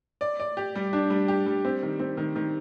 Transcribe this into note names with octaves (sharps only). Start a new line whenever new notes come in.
D5
D5
G4
G3
D4
G3
G4
G3
C4
D#3
C4
D#3
D#3